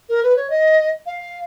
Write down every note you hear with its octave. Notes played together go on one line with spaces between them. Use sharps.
A#4
B4
C#5
D#5
F5